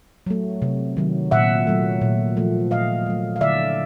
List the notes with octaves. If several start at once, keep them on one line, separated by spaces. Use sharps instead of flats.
F#3 A3
C3
D#3 F#3
A#2 E5 F#5
F#3 A3
A#2
F3 A3
A#2 D#5 F5
F#3 A3
F5
D3 D5 E5